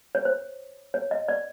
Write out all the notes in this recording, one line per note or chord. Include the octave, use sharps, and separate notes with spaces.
C#5
C5
C#5
D#5
D5